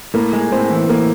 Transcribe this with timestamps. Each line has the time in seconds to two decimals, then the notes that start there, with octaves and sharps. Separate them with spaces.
0.14 A2 A#3
0.33 G#3
0.52 A2 C4
0.71 E3
0.89 A2 A#3